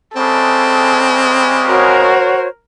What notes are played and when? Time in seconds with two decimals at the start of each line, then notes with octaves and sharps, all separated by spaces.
0.16 C#3 G3 G#3 C4 A4
1.66 F#4 A#4 C5 C#5